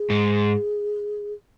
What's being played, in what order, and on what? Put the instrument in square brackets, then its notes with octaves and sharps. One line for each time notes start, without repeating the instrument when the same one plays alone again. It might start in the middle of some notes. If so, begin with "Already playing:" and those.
Already playing: [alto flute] G#4
[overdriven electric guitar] G#2